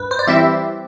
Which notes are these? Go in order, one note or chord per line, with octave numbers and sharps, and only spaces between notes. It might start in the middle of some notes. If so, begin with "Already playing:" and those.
Already playing: G2 B4
C5
D5
E3 G3 C4 E4 E5